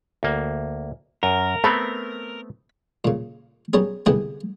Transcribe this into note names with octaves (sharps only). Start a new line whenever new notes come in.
D2 A#3
F#2 A#4
A3 B3 C4 B5
A#2 C#3
F#3 G3 B3 C#4 G#4
C2 D3 B3 G4 G#4 B4